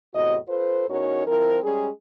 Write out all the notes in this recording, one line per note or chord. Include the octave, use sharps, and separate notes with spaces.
E2 A2 C3 F#4 D#5
F4 A4 B4 C5
E2 C#4 D#4 F#4 A#4 C#5
F3 C4 E4 A#4
G3 G#3 C#4 G#4